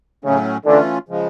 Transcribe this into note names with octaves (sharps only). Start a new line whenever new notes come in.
A2 C#3 F#3 A3 C#4
D3 E3 A3 C#4 F4
C#3 F3 G#3